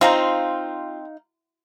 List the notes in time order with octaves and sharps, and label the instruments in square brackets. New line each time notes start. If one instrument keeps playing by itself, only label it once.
[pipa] C4 C5 A#5 [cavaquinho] D#4 F5 [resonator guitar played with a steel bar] F4